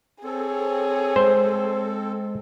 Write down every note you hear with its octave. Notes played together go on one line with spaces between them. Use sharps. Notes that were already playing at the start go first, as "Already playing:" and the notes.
C4 G#4 A4 C#5
G#3 C5